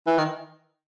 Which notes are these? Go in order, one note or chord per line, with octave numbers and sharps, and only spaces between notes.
E3
D#3